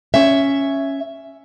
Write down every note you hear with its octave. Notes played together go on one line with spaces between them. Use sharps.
C#4 E5